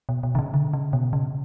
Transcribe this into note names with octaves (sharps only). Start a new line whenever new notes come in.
B2
B2
D3
C#3
D3
C#3
B2
C#3